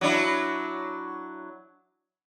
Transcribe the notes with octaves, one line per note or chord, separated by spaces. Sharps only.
F#3 D4 E4